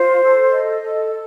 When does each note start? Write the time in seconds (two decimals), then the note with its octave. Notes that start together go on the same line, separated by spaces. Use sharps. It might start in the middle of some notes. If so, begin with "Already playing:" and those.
Already playing: F4 C5
0.23 A4
0.52 D#5
0.83 A4